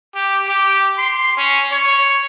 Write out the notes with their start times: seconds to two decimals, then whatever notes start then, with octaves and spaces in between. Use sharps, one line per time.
0.15 G4
0.48 G4
0.98 C6
1.38 C#4
1.72 C#5